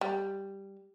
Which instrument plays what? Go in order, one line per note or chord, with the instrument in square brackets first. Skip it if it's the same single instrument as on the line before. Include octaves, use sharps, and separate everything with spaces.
[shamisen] G3